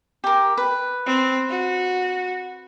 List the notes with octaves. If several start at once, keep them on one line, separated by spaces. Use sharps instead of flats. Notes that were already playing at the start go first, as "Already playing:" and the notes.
G4 A#4
B4
C4
F#4